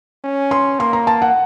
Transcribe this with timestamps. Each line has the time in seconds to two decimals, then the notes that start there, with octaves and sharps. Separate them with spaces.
0.24 C#4
0.51 C6
0.79 A#3 C6
0.93 A#5
1.07 A5
1.22 F#5